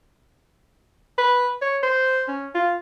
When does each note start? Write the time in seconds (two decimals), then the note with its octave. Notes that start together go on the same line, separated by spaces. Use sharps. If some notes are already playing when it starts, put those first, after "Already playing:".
1.18 B4
1.62 C#5
1.83 C5
2.28 C#4
2.55 F4